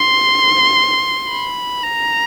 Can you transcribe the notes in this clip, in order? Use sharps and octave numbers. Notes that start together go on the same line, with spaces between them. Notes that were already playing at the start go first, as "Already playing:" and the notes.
Already playing: C6
B5
A#5